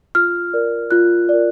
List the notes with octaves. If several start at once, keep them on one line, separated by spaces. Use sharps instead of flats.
F4 F6
A#4 D5
F4 F#6
A#4 D5